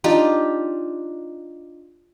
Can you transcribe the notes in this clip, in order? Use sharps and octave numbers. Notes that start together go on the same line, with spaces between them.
D4 D#4 F4 G4